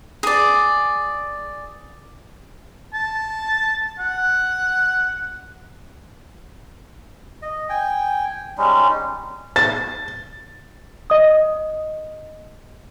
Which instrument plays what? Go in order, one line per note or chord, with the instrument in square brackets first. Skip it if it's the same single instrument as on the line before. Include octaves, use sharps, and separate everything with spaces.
[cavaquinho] G#4 D5
[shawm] A5
F#5
[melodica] D#5
G5 G#5
G3 G#3 C#4 D#4
[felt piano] A6
[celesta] D#5 D#6